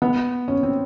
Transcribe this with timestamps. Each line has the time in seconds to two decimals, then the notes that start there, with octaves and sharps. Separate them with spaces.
0.02 B3
0.48 C#4
0.63 C4